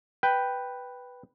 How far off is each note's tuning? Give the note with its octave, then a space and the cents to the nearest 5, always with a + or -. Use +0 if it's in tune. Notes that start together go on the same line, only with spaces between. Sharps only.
B4 +0 G5 +0